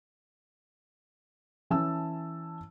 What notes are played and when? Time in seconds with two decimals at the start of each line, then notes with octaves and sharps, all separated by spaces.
1.70 E3 C#4 A5 E6